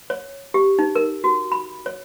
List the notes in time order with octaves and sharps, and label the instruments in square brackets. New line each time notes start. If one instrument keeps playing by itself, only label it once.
[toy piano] C#5
G4
D#4
A#4
F#4
B5
C#5